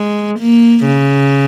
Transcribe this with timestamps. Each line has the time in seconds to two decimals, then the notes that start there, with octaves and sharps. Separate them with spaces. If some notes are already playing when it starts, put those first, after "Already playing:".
Already playing: G#3
0.39 A#3
0.85 C#3